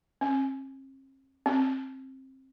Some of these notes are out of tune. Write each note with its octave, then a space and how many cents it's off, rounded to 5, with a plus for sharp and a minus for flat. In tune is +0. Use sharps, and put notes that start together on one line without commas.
C4 +45
C4 +20